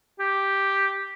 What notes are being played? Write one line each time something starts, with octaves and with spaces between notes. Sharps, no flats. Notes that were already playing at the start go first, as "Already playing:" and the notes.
G4